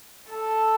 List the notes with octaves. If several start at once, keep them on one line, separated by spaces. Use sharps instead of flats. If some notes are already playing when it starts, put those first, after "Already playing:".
A4